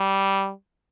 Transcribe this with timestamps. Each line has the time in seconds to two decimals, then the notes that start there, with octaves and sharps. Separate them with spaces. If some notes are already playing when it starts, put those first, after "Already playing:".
Already playing: G3